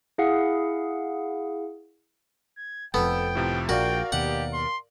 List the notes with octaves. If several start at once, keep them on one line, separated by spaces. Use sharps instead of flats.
E4 G#4 F5 F#5
G#6
F1 F2 B3 A4 G5
A2 C3 F3
A#1 F#4 A#4 D5 F5 G5
D#2 B2 G4 F#5
C6